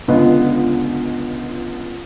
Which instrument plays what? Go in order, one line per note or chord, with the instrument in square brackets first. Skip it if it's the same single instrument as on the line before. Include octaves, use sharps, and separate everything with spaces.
[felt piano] C#2 D3 B3 F4 B4 D#5